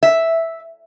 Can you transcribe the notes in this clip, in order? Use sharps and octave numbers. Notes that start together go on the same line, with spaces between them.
E5